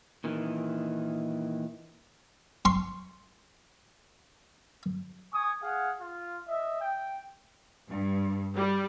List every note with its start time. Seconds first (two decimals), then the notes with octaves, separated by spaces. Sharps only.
0.24 A#2 D#3 E3
2.65 C6 C#6
5.32 G#5 C#6 D#6
5.62 G#4 F5 F#5
6.00 F4
6.47 D#5 E5
6.80 G5
7.88 G2
8.55 G3